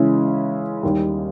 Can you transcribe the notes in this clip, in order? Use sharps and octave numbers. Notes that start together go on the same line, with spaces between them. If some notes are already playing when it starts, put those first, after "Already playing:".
Already playing: C#3 E3 G#3 C#4 E4
D#2 D#3 G3